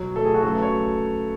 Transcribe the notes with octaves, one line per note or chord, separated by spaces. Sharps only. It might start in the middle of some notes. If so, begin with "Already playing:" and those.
Already playing: B2 F#3
B2 F#3 A3 A4
G#4
F#4
C#3 F#3 A3 A4
B4
C#5